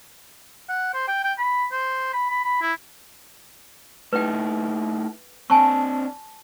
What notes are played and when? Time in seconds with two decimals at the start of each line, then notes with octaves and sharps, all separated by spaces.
0.69 F#5
0.93 C5
1.08 G5
1.23 G5
1.38 B5
1.72 C5
2.13 B5
2.30 B5
2.44 B5
2.62 E4
4.13 A3 D#4 E4 B4 G5
5.50 C4 D4 G#5 A5 C#6